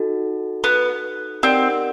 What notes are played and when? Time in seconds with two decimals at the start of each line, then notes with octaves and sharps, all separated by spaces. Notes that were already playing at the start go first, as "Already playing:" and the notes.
Already playing: D#4 F#4 A4
0.64 B3
1.43 C4 D#4 G4 A#4 D5 F#5